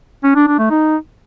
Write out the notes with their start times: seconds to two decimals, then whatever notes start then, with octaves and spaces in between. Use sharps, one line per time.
0.24 C#4
0.35 D4
0.47 D4
0.59 A3
0.70 D#4